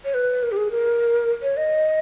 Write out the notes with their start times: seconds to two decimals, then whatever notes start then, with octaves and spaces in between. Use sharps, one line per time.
0.05 C#5
0.14 B4
0.43 A#4
0.52 G4
0.57 G#4
0.71 A#4
1.42 C#5
1.57 D#5